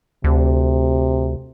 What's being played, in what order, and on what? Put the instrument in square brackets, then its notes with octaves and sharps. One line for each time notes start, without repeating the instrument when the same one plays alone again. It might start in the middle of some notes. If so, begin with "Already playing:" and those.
[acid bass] D2 [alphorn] C3